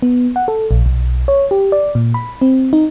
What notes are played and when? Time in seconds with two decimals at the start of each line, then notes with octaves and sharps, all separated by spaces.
0.02 B3
0.36 F#5
0.48 A4
0.71 A#1
0.86 B1
1.28 C#5
1.51 G4
1.72 D5
1.95 A#2
2.14 B5
2.41 C4
2.73 D#4